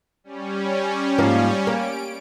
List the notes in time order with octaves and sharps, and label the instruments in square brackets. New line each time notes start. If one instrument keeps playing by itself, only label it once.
[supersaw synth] G3 C#4
[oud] G#2 F3 A#3
[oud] A#3 C#4 [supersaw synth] D7